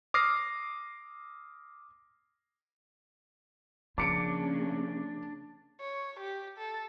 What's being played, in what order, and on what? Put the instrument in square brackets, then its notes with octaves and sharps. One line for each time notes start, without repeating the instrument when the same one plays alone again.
[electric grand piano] D6 D#6 F6 A#6 C7
[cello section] C#3 A#3 C#4 [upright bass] F3 [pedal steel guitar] D4 [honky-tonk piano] D6 C#7 D7
[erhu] C#5
G4
A4